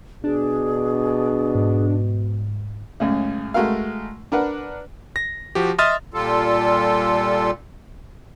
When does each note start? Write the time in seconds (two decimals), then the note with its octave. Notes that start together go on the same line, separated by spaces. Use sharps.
0.24 B2 D4 G#4
1.55 G#2
3.00 C#2 F#2 A2 C#3
3.54 G#3 A3 F#4 A#4 F5
4.32 D4 A#4 B4 F#5
5.16 A#6
5.55 F3 F#4 G4
5.78 D#5 E5 C6 D#6 F6 A6
6.14 A#2 G3 F4 A4